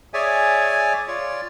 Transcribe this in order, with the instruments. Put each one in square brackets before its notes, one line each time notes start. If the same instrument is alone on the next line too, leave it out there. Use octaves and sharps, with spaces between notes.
[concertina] G#4 C#5 D5 E5 G#5
F4 C#5 D5